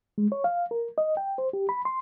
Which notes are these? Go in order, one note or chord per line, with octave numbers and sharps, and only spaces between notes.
G#3
C#5
F5
A#4
D#5
G5
C5
G4
B5
C6